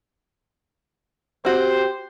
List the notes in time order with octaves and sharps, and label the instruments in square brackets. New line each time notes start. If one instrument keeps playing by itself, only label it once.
[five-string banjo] C4 F#4 [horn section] G4 C5